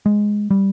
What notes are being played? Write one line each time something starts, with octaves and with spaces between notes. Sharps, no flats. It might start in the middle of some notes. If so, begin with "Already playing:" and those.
G#3
G3